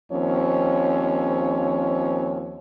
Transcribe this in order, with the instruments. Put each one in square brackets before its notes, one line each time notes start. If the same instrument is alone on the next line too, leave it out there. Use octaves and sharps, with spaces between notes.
[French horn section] D#2 F3 C4 C#4 C#5